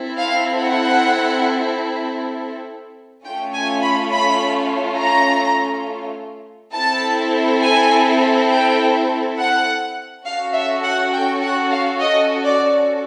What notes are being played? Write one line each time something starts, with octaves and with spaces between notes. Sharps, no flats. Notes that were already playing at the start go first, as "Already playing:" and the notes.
Already playing: C4 E4 A4
F5
F#5
A3 C#4 F4 G5
G#5
B5
B5
A#5
C4 E4 A4 A5
G#5
G5
F#5
C#4 F#4 A4 F5
E5
F#5
G5
F#5
F5
D#5
D5